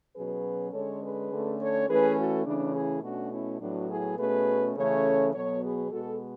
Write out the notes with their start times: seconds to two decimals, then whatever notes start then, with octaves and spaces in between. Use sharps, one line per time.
0.15 B2 F#3 C#4 G#4 B4
0.73 D3 G#3 C#4 A4 C#5
1.03 G#4 B4
1.31 D3 A3 C#4
1.59 A4 C#5
1.88 E3 A3 C#4 G#4 B4
2.18 F#4 A4
2.45 C#3 E3 A3 C#4 D4
2.75 E4 G#4
3.03 B2 A3 C#4 D4 F#4
3.32 C#4 E4
3.61 A2 F#3 B3 D4 F#4
3.90 E4 G#4
4.18 B2 A3 C#4 G#4 B4
4.76 C#3 E3 A3 C#4 A4 C#5
5.33 B2 F#3 B3 A4 C#5
5.62 G#4 B4
5.91 B2 G#3 B3 F#4 A4